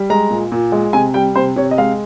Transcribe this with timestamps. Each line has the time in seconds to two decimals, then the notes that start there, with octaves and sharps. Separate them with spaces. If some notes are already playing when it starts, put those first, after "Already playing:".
Already playing: G3
0.10 G#3 A#5
0.30 A#2
0.52 A#2
0.72 G#3
0.93 C3 G#5
1.14 G3 G5
1.35 C3 C5
1.56 C3 C#5
1.71 D#5
1.78 G#3 F5